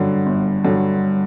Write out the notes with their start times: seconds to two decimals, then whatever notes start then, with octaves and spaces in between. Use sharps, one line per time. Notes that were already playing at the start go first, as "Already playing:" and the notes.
Already playing: G2 D3 F#3
0.26 G1
0.65 G2 D3 F#3